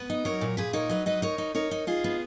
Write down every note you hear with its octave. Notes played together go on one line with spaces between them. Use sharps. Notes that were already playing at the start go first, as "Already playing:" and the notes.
Already playing: B3 B4
D#4
F#3 A#4 C#5
A#2
A#2 G#4 B4
D#4 A#4 C#5
F#3 B4 D#5
D#4 B4 D#5
D#4 A#4 C#5
D#4
D#4 A#4 C#5
D#4
D#4 F4 G#4
B3